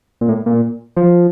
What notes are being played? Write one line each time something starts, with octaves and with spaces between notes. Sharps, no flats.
A#2
A2
A#2
F3